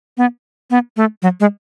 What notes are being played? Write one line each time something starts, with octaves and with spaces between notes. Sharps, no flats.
B3
B3
A3
F#3
G#3